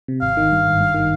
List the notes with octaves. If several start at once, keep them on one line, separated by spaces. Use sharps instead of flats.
C3
G#1 F5
D#3
G2
G#1
G2
D#3